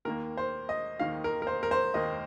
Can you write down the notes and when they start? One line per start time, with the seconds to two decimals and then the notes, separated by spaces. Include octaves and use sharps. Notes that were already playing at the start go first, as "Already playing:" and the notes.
0.05 D#2 D#3 A#3 A#4
0.37 C5
0.69 D#5
1.00 D#2 D#3 A#3 F5
1.24 A#4
1.42 A#4
1.47 C5
1.63 A#4
1.71 C5
1.94 D#2 D#3 A#3 D#5